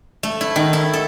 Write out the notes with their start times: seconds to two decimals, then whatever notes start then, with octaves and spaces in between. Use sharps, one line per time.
0.23 A3
0.41 E4
0.56 D#3
0.73 E4
0.93 A4